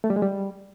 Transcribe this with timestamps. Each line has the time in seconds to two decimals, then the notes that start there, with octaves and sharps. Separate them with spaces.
0.04 A3
0.10 G3
0.16 G#3
0.22 G3